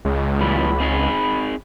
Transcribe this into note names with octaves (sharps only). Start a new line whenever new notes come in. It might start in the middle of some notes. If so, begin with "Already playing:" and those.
C#2 G#3
A#2 E3 G3 B5
C4 D#4 G#4